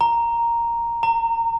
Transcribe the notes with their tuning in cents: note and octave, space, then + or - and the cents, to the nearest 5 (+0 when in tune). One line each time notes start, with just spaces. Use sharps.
A#5 +0
A#5 -25